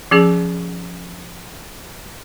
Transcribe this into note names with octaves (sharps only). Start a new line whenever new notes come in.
F3 C#4 G#4